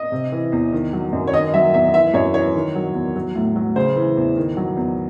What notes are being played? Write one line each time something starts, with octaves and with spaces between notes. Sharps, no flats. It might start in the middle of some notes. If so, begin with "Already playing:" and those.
Already playing: D#5
C3
E3
E2
D#3
F#3
F#2
C#5
D#3 D#5
F#3 E5
E2 E5
E3 E5
F#2 C#5
E3 C#5
D#3
F#3
E2
F#3
A2
F#3
C#3 C5
E3
E2
D#3
F#3
E2